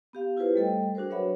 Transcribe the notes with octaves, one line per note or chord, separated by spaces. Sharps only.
B3 G4 F5
E4 F4 G4 G#4 B4 C5
G3 A3 A4 D#5 G5
D4 F#4 G#4 A#4 C5
F#3 B4 C#5 E5 F#5 B5